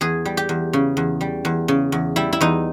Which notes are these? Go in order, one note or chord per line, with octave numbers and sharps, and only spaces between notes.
E2 G#4
G3
G4
E2
C#3
E2
G3
E2
C#3
E2
G3 E4
E4
E2 D#4